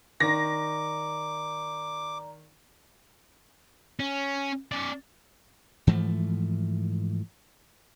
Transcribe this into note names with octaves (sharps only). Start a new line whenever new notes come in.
D#3 D5 A#5 D6 A#6
C#4
C#4 D5
G#2 E3 F3 A3